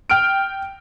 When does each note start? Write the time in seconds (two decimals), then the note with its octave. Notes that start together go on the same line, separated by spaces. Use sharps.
0.10 G5 F6 D7